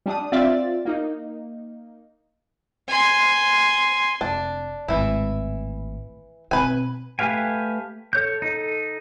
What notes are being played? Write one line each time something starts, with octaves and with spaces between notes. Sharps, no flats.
G3 D4 D#6
C4 F4 D5 E5 A6
A#3 D#4
G#5 C6
F1 D4
G#1 A2 E3 E4
B2 C4 B4 G#5
A3 G4 B4 F5 G#5
A4 C#5 G6
D#4 A4